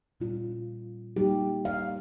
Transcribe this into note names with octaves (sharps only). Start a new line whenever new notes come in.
A#2 G3 C#4 F4
G3 A#3 D#4 G4
F5